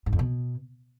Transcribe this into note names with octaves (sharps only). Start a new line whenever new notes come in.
G#2
F2
B2